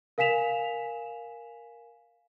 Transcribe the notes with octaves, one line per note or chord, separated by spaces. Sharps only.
A#4 F5 G#5 B6 E7 F7